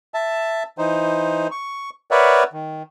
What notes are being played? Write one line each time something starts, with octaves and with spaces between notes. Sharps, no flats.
E5 A5
E3 D#4 C5
C#6
A#4 B4 C#5 D5 E5 F#5
D#3